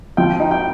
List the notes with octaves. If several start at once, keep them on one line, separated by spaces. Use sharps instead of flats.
F3 G5
D#4
G5